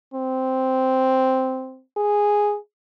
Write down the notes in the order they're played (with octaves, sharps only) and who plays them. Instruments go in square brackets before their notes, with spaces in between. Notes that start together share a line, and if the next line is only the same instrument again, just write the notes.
[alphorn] C4
G#4